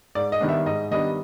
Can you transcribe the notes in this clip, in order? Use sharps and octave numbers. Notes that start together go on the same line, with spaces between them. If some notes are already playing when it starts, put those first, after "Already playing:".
G#2 D5
D#5
D#3 G3 B3 D4
E5
G#2 D#5
D#3 G3 B3 D4 D#5